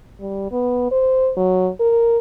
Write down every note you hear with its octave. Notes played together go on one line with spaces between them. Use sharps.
G3
B3
C5
F#3
A#4